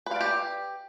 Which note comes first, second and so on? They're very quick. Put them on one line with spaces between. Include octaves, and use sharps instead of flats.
B4 F5 D5 G4